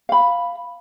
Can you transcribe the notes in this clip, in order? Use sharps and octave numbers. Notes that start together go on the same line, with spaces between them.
F5 B5